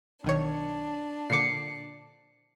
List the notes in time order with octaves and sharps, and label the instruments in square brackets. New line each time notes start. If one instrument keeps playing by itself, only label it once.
[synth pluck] B1 D#3 C#5 [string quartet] D4
[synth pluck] A#2 D3 D6 [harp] C7 C#7